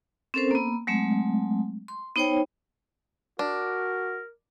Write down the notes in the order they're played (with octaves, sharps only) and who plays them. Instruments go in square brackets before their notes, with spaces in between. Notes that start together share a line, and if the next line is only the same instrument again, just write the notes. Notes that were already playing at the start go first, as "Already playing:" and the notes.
[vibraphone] C4 C#4 A4 A#4 C5
A#3 B3
F#3 G#3 A3 C4
C6
B3 D#4 C5 C#5 G5
[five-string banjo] D4 [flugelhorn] F#4 [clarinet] A#4